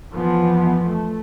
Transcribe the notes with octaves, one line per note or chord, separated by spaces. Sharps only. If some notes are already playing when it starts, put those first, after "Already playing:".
F2 E3 F3 B3
A3